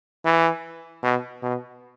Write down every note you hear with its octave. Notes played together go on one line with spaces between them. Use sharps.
E3
B2
B2